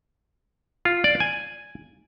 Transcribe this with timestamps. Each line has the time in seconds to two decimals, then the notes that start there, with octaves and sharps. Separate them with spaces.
0.85 F4
1.04 D5
1.20 G#5